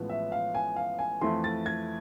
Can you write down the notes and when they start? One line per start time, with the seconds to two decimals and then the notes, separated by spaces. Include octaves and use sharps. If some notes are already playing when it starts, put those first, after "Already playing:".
Already playing: A1 A2 F3 G#3 B3
0.10 E5
0.32 F5
0.55 G#5
0.76 F5
0.99 G#5
1.21 F2 E3 A3 E4 C6
1.44 A6
1.66 G#6